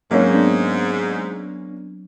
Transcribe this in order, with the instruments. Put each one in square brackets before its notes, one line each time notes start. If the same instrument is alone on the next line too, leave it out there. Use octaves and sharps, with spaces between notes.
[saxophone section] G#2 [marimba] F#3 C4 [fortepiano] A#3 C#4
[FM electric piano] B3 D4